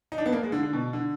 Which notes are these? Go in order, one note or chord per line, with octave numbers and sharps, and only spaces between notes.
D#4
D4
B3
A#3
G#3
D3
D3
B2
D3